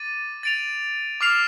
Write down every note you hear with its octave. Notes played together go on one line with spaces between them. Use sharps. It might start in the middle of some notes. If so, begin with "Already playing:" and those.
Already playing: D6 A6 D#7
A6 D7 F7
D6 F6 C7 F7